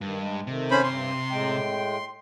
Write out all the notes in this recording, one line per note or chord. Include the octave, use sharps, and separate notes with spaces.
G2 D#3
G#3
C3 D#3 A3
C#4 C5 B5
G2 C6
A2 G#3 G5